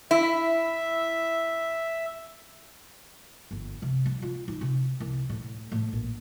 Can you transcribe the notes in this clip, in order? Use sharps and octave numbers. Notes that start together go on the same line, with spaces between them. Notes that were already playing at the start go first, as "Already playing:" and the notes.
E4 E5
G1
C3
G3
F4
D#4
C3
C2
A2
A2
A#1